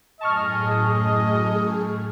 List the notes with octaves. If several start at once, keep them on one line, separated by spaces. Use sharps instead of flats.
F#2 A2 G#4 D#5 A5 C#6 F6